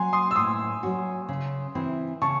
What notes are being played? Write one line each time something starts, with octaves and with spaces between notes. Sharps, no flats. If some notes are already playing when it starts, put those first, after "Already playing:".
Already playing: F#3 C#4 F#4 G#5 C6
C6 D#6
E6
A2 C6 D#6
F#3 C#4 F#4
C#3
E3 C4 E4
C#3 A5 C#6